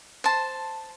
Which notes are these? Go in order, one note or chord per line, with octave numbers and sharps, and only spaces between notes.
C5 A5